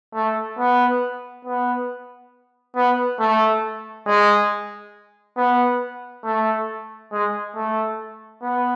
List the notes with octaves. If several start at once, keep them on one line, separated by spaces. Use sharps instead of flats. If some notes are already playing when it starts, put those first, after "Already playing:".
A3
B3
B3
B3
A3
G#3
B3
A3
G#3
A3
B3